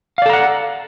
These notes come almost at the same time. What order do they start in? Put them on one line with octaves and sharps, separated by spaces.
F5 D5 A4 A#5 F#5